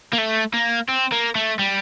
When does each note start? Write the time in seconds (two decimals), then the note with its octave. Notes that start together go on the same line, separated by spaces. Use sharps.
0.13 A#3
0.18 A3
0.54 A#3
0.89 C4
1.12 A#3
1.35 A3
1.59 G3